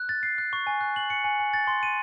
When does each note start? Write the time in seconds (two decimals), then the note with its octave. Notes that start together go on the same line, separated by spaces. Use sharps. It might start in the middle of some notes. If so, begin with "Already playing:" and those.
Already playing: F#6
0.09 A6
0.23 C7
0.38 F#6
0.53 C#6
0.67 G#5
0.81 F#6
0.96 F#7
1.10 C#7
1.24 G#5
1.40 G#5
1.53 A6
1.67 C6
1.83 D#7